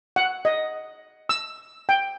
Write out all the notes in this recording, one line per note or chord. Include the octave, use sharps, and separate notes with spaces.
F#5
D#5
E6
G5